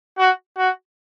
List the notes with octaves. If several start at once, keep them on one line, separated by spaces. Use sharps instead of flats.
F#4
F#4